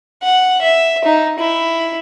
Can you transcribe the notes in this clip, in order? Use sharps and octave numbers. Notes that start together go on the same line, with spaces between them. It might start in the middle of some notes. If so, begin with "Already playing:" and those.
F#5
E5
D#4
E4